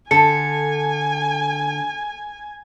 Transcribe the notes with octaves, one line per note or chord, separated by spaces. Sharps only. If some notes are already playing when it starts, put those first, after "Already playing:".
D3 A4 G#5 C#7